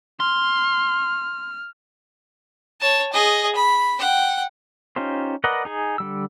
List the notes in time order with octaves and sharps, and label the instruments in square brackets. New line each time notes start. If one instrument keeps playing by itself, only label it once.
[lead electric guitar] C6 [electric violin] F6
[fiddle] C#5 A5
G#4 D#5
B5
F#5 G5
[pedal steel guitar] C#4 D#4 F4 G4 C5
A#4 B4 D5 D#5 F#5
D#4 G#4 G#5
D3 G3 E6